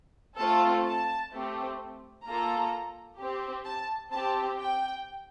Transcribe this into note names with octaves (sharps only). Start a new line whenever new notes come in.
A3 C4 F4 A4 A5
A5
A3 C4 G4
A#3 F4 A4 A#5
C4 G4
A5
C4 G4 A5
G5